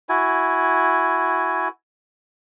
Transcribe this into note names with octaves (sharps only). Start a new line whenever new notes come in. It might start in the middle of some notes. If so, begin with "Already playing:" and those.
E4 F#4 G#5